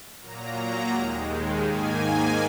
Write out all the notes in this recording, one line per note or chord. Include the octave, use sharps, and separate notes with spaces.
A#2 F#3 A#3 A#5
D#2 D#3 G#3
G#2 D#3 A#3 G#5